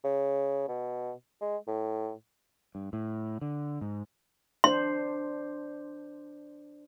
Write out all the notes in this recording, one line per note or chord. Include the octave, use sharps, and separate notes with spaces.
C#3
B2
G#3
A2
G2
A2
D3
G#2
D4 C5 C6